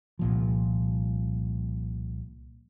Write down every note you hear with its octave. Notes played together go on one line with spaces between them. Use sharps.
C2 A#2 F3